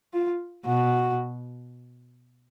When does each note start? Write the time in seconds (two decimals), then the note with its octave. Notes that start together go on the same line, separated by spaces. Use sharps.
0.13 F4
0.65 B2 F#4